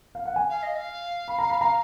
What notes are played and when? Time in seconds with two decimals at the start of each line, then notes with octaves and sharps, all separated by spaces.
0.15 F5
0.25 F#5
0.36 G#5
0.49 F5
0.63 D#5
0.76 F5
1.28 B5
1.39 A#5
1.50 B5
1.61 A#5